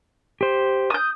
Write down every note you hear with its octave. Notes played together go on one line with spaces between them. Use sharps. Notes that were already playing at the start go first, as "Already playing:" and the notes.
G4 C5
D#6 G6